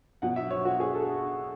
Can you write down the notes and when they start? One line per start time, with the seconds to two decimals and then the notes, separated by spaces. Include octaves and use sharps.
0.22 B2 F#3 F#5
0.36 E5
0.51 C#5
0.65 F#4
0.80 G#4
0.95 A4